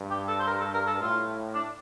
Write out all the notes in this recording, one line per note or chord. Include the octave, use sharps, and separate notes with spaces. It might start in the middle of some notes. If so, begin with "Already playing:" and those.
Already playing: G2
G4
A4
C5
A#4
A4
A#4
A4
A2 F4
D4